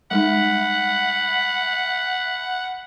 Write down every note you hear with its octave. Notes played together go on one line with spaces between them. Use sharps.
G3 G#3 D#4 F#5 B5